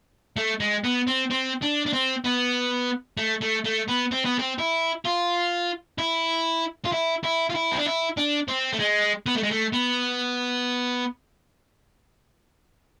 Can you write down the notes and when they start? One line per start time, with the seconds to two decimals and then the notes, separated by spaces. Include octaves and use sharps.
0.37 A3
0.60 G#3
0.84 B3
1.07 C4
1.31 C4
1.62 D4
1.86 D4
1.93 C4
2.24 B3
3.17 A3
3.41 A3
3.64 A3
3.88 B3
4.11 C4
4.25 B3
4.39 C4
4.58 E4
5.05 F4
5.98 E4
6.85 F4
6.92 E4
7.24 E4
7.50 F4
7.55 E4
7.72 C4
7.78 D4
7.86 E4
8.17 D4
8.48 C4
8.72 A3
8.79 G#3
9.26 B3
9.35 A3
9.43 G#3
9.51 A3
9.73 B3